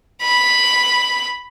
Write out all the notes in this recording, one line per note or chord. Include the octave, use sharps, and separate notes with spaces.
B5